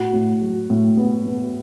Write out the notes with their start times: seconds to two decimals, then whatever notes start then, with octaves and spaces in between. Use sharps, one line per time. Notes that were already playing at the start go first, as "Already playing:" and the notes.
Already playing: A2 F#4
0.13 A2
0.41 F#3
0.70 A2
0.97 B3
1.26 B3